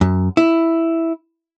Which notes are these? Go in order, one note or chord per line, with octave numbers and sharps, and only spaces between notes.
F#2
E4